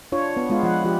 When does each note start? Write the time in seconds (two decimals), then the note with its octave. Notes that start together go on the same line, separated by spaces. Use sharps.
0.12 D4 F4 C#5
0.37 B3
0.50 G#3 B3 F4
0.63 F3 F#5
0.84 F3 F4 G4